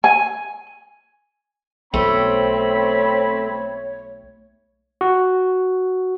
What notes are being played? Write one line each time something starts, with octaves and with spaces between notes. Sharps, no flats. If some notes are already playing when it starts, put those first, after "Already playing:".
G#5
B1 A3 C4 C#5 B5
F#4